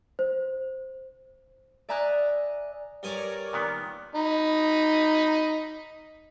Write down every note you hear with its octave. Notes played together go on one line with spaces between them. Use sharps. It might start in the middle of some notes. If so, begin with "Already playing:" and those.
C5
D5 E5 G#5 A#5 D#6 F#6
G2 A#4 C#5 D5 G#5 D#6
A#2 D#3 B3
D#4 B5